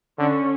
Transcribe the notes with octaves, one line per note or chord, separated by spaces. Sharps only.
D3 C#4